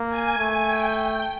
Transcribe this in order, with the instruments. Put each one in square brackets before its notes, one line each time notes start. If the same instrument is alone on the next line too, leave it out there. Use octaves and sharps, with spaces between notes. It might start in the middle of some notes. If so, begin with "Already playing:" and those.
Already playing: [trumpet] A#3
[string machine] G#5
[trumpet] A3
[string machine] G5
G5